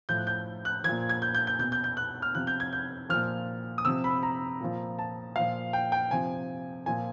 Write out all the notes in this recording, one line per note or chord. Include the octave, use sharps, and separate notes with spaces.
A2 F3 G6
F#6
G6
F#6
A#2 F3 G#6
G#6
G6
G6
G6
B2 G6
G6
G6
F#6
F6
C3 F3 F#6
G6
G#6
G6
A#2 F3 F6
D#6
C3 F3 E6
B5
A#5
A#2 F3
A5
A#2 F3 F5
G5
G5
C3 F3 G#5
A#2 F3 G#5